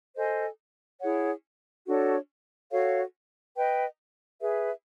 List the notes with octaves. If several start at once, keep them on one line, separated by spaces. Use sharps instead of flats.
A4 C5 D#5 G#5
E4 G#4 C#5 F#5
D4 F#4 A4 C#5
F#4 A4 C#5 F5
B4 D#5 G5
G#4 B4 E5